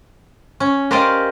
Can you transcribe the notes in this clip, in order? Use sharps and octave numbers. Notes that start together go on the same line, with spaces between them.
C#4
G4 A#4 C5 D5 D#5 F5